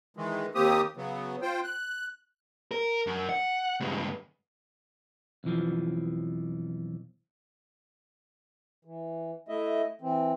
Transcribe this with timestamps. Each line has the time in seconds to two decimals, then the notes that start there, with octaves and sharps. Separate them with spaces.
0.17 D#3 E3 G#3
0.55 D#2 A#3 C4 G4 D#6
0.97 C#3 F#3 B3
1.42 F4 C5 G5
1.63 F#6
2.71 A#4
3.07 F#2
3.29 F#5
3.80 C#2 G2
5.44 B1 F2 E3 F3
8.85 E3
9.48 A3 E4 D#5 E5
10.01 E3 C4